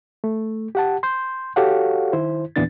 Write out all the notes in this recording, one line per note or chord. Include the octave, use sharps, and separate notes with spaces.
A3
G4 F#5 A5
C6 G6
F#4 G4 A4 C#5 F5 F#5
D#3 E4 C5
D#2 A#2 E3 B3 D4 A6